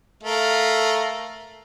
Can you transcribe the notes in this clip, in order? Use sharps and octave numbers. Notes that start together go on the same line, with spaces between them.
A3 A#4 F5